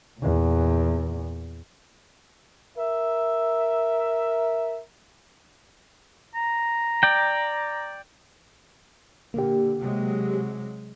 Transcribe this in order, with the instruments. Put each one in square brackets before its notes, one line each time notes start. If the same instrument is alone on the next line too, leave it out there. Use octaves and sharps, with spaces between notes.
[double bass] E2 A#2
[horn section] A#4 E5
[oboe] A#5
[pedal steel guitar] D5 G5
[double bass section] A#2 D3 [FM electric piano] A#3 G4
[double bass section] C3 F#3 G#3